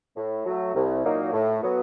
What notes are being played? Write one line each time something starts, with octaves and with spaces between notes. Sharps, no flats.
A2
F#3 A3
C2
A#2 F#3 A#3 D#4
A2
F#3 B3